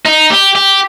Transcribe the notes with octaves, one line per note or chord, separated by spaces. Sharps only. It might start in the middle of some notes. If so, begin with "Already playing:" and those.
D#4
G4
G4